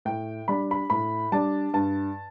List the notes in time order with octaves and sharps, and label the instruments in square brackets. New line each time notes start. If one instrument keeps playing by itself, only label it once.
[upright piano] A2 G5
G3 D4 B5
B5
A2 B5
G3 D4 A5
G2 A5